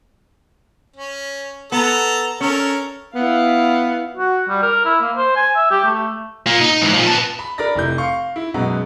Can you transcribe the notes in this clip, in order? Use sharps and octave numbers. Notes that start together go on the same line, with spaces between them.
C#4
B3 A4 A#5
C#4 A4 A#4 C#5
B3 E4 F5
F#4
G3
A#4
E4
A#3
C5
G#5
E5
G4
A3
A#2 A#3
D#4
G#2 E3
A#2 F3
B4 A5
B5
A#4 D5 A#5 B5 A6 A#6
F1 E4 G6
F5 C6 C#6
E4
F#2 B2 G#3 B3 A#5